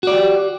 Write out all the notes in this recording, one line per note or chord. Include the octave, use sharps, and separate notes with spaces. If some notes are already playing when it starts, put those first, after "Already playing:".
F#4 G4 D5